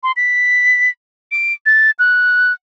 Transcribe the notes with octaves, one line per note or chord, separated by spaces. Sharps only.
C6
B6
D7
A6
F#6